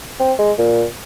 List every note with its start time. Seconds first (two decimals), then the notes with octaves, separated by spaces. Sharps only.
0.20 C4
0.39 G#3
0.58 A#2